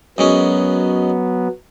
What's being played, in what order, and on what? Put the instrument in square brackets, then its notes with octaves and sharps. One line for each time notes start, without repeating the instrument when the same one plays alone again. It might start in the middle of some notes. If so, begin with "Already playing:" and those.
[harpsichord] F#2 G#3 C#4 [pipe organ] F#3 B3